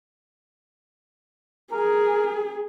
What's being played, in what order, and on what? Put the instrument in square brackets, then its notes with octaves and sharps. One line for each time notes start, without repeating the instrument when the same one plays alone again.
[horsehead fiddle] G#4 [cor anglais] A#4